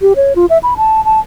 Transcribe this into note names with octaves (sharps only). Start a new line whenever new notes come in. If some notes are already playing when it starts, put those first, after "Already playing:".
G4
C#5
F4
E5
B5
A5
A5